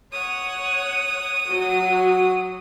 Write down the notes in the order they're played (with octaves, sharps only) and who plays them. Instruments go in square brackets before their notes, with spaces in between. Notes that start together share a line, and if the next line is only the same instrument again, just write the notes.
[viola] C#5 F#5 [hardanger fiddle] D#6
[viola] F#3 [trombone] F#4